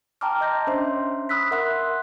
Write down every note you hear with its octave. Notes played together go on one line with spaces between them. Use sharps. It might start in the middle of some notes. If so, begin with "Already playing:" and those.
G5 A5 A#5 C6 D6 F6
D#5 G6 A#6
C#4 D4 C5 E5 C6
B5 D#6 E6 F#6 B6
A#4 E5 F#5 C6 F#6